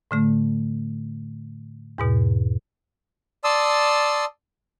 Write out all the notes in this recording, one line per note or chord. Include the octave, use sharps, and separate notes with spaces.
A2 D3 A3
E2 G#2 B2
D5 A5 C6 D#6 E6